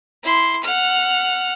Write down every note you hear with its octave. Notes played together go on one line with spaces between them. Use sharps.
E4 C6
F#5 F6